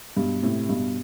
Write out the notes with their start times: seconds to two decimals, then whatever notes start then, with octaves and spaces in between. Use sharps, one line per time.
0.17 G2 B2
0.43 A2 C3
0.69 G2 B2